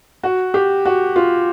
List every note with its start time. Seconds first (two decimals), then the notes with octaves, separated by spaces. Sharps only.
0.23 F#4
0.54 G4
0.85 F#4
1.16 F4